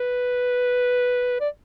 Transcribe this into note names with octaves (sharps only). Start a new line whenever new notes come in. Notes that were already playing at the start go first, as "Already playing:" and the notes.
Already playing: B4
D5